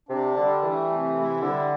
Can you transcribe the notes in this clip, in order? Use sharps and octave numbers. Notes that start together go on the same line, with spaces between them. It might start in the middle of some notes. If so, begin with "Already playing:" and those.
C3 D4
D3 G3
E3 A3
C3
E4
D3 G3